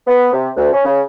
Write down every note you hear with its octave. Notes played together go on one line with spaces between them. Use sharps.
B3
C3
D2
C#4
C#3